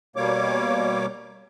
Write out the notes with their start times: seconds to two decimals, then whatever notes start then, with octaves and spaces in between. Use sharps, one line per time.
0.16 B2 G3 A#3 C#5 D6